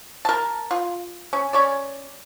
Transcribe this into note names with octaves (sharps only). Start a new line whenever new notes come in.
A#4 A5
F4
C#4
C#4 C#5 D5